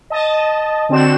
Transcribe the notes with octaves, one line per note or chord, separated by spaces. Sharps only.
D#5 A5
D3 C4 D4 F#4 E7